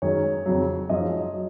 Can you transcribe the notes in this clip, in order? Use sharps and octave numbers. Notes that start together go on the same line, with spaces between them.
F#2 D#3 G#3 C#5
F2 C#3 F#3
F#2 F3 G#3 D#5
F#3